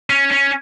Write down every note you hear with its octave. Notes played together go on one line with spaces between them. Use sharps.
C#4
C#4